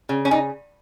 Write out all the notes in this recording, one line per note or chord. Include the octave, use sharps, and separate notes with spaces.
C#3
C#4
D#4